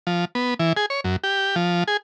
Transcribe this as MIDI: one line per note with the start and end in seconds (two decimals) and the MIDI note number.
0.07 0.25 53
0.35 0.54 59
0.59 0.73 52
0.77 0.86 68
0.90 1.01 73
1.04 1.16 42
1.24 1.55 67
1.56 1.84 53
1.88 1.97 68